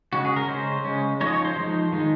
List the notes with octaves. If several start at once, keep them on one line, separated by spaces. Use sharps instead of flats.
C#3 G#3 C#4 F#4
G#4
A#4
C#3 G#3 C#4 C5
C#3 G#3 C#4
F3 G#3 D#4 C#5
D#5
C#5
C5
F3 G#3 D#4
D#3 G#3 D#4